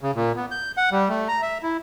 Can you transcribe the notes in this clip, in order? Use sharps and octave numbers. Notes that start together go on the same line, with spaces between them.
C#3
A#2
B3
G6
F#5
G3
A3
A#5
E5
E4